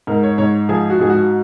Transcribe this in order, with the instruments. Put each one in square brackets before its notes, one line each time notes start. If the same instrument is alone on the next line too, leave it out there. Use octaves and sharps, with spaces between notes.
[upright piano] G#2 A#4
C#5
G#2 C#5
F3 G#4
F#4
G#2 G#4
F#4